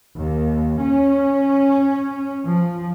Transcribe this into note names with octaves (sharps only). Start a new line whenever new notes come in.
D#2
C#4
F3